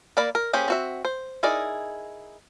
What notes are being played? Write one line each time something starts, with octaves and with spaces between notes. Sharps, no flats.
A#3 A#4 D5 B5
A#4
A#3 C#4 G4 G#4 C5
C4 F#4 E5
C5
D#4 E4 G#4 A#4 D5